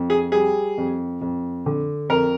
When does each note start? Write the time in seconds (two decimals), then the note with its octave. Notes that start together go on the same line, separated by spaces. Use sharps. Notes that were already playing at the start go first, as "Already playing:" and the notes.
Already playing: F2
0.10 G#4
0.32 G3 G#4
0.77 F2
1.21 F2
1.66 D3
2.09 F2 A#4